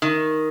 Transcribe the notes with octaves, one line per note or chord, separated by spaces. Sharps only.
D#3